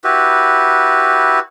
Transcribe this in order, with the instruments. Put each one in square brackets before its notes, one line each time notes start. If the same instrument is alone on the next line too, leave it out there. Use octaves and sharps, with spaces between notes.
[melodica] E4 F#4 G4 B4